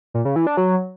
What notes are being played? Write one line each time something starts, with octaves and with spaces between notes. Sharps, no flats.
A#2
C#3
E3
D4
F#3